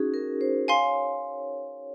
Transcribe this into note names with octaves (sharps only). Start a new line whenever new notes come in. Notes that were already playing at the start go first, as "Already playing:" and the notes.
Already playing: C#4 D#4 F#4 G#4
A#4
C5
C#5 F5 G#5 C6